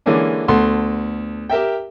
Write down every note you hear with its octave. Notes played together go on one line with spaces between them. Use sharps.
D3 E3 G#3 A#3 C#4 D4
D2 B3 A4 C6
G4 A#4 E5 G5